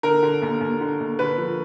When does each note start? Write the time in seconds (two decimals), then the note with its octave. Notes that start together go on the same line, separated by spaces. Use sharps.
0.03 D3 A#4
0.23 D3
0.42 D#2
0.61 D#2
0.81 D3
1.00 D#2
1.19 D3 B4
1.38 F3